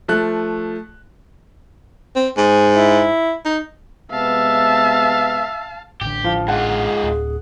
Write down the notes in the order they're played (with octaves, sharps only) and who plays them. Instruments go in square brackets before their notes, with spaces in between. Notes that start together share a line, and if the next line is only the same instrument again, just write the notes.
[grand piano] F3 A3 F#6
[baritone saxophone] C4
[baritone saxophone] G#2 [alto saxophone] G#4
[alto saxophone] E4
[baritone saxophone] D#4
[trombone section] C3 G#3 B3 [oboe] E5 [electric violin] F5 A5
[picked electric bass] A1 D3 [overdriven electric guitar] G4
[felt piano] F3 [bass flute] F5
[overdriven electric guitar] G#2 F4 [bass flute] G#4 [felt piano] F#5
[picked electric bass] D1